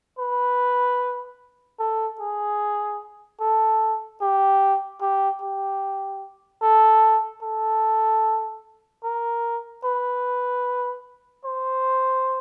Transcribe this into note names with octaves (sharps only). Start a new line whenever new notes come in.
B4
A4
G#4
A4
G4
G4
G4
A4
A4
A#4
B4
C5